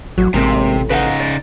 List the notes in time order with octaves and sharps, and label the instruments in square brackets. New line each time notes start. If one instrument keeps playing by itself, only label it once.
[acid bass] A1 [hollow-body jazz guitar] F#3
[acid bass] A1 [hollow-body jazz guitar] G#2 A#3 C4 [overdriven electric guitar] C3
[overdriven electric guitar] C#3 D#4 [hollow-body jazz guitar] B4 F5 F#5
[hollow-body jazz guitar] D5